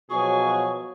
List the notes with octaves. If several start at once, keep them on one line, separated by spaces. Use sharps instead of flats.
B2 F3 F#3 F#4 G#4 C#5 C#6